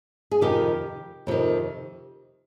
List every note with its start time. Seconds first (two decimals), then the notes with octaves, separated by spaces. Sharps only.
0.31 G#4
0.41 F2 C3 D#3 G4
1.27 F2 C3 D#3